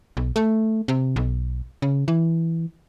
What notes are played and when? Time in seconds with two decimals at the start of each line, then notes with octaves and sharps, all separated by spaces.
0.17 B1
0.36 A3
0.88 C3
1.16 B1
1.82 C#3
2.08 E3